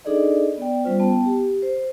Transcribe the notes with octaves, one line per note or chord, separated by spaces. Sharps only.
D4 D#4 G#4 A4 D5 D#5
B3 D5 G5
G3 C#4 F4 C5
B3 G5 A5
G4
C5